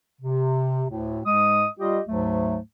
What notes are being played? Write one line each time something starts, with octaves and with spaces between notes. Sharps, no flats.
C3
D2 A2
G#2 G#3 D#5 D#6
G3 F4 G4 D#5
D2 G#2 F#3 A3